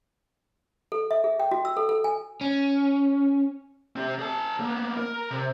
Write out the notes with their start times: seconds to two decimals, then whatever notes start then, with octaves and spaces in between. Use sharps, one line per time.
0.92 A4
1.11 E5
1.24 G#4
1.40 G5
1.51 F#4
1.65 E6
1.77 A4
1.89 A4
2.04 G#5
2.41 C#4
3.96 C4 G4
4.19 G#4 A5
4.59 A#3 B3
4.97 A#4
5.31 C3